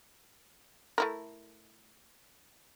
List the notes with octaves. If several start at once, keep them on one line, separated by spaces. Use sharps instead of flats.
A3 E4 A#4